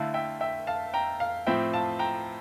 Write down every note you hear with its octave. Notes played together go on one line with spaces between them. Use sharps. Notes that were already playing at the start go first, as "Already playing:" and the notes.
Already playing: D3 A3 E4 F5
E5 G5
E5 G5
F5 A5
G5 A#5
F5
A2 F3 C4 E5 G5
F5 A5
G5 A#5